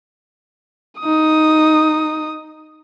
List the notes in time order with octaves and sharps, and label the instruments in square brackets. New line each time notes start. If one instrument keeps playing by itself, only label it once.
[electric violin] D#4 D#6